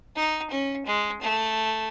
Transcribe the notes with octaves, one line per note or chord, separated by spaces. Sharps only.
D#4
C#4
G#3
A3